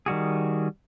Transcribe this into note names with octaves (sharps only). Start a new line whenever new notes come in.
D#3 G3 F#4 G#4